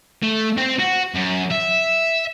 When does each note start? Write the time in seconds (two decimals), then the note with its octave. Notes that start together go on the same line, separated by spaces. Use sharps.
0.23 A3
0.58 C4 C5
0.80 F#4
1.15 F#2
1.51 E5